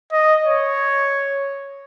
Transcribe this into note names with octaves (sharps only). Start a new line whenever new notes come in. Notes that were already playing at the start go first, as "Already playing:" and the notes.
D#5
C#5